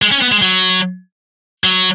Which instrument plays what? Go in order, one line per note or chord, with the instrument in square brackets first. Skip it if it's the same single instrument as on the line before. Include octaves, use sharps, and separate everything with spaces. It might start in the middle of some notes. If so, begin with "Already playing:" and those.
[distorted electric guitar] G#3
C#4
B3
G#3
F#3
F#3